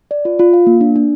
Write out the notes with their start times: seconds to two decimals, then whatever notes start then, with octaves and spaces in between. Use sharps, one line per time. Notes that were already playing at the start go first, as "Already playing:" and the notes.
0.11 D5
0.25 F4
0.39 F4
0.53 F5
0.67 A#3
0.81 D4
0.96 D4